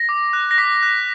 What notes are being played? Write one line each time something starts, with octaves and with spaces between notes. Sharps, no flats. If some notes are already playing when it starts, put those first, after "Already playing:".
Already playing: A#6
D6
F#6
A#6
D6 B6
F#6